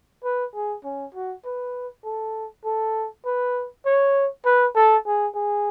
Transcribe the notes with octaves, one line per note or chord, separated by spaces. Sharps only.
B4
G#4
C#4
F#4
B4
A4
A4
B4
C#5
B4
A4
G#4
G#4